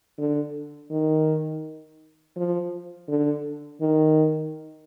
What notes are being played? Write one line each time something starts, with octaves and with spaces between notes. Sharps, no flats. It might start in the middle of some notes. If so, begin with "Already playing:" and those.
D3
D#3
F3
D3
D#3